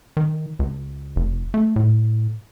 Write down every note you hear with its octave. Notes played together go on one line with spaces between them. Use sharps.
D#3
C#2
F1
A3
A2